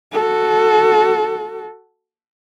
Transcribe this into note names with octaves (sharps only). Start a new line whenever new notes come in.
F#4 A4